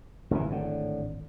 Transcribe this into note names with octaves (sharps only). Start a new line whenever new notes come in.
G#1 C#2 C#3 E3
A2 D3